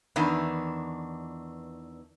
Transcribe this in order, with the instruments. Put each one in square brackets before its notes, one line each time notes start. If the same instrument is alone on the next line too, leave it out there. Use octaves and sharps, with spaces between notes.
[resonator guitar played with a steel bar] E2 D#3 E3 D4